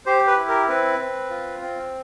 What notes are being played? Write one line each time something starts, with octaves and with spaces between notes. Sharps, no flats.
G4 C5
B4
E4
A#4
C4 B4
C4
F4
C4